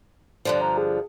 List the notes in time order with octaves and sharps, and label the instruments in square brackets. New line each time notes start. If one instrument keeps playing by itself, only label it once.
[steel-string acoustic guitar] G2 D3 F3 [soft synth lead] D5
[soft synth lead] A#5
G#4